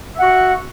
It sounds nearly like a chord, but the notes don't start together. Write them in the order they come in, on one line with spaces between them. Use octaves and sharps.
E5 F#5 F#4